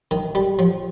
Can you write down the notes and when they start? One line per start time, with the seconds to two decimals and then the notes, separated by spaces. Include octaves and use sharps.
0.11 D#3
0.35 G3
0.59 F3